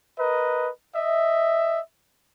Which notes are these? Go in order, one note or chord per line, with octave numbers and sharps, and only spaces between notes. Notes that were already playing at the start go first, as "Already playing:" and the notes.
A#4 B4 D#5
D#5 E5